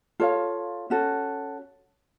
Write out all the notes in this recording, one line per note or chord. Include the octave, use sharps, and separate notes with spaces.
F4 A4 C#5 F5
C#4 F#4 A4